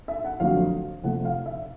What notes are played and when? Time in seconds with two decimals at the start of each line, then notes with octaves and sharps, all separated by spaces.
0.08 E5
0.24 F#5
0.40 F2 D3 F#3 A3 F5
1.03 F2 C3 F3 A3 F#5
1.25 F5
1.46 E5